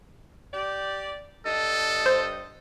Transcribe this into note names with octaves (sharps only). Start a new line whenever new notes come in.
G4 D5
G2 A4 D#5
C5